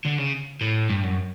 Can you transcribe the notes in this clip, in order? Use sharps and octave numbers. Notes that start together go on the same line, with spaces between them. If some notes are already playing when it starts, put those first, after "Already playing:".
D3
C#3
A2
G2
F#2